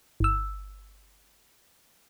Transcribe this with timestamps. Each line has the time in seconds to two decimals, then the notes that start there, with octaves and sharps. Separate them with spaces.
0.20 G1 E6